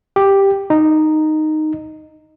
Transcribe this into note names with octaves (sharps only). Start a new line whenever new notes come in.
G4
D#4